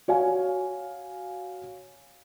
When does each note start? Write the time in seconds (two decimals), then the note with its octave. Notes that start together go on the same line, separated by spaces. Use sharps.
0.08 F#4 C#5 F5 G#5